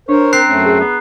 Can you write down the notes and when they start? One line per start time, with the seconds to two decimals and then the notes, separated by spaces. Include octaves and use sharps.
0.09 D4 A#4 C5 C#5
0.33 C4 A#5 F#6 C7
0.47 F#2 A3 C#4
0.65 G#4
0.80 B3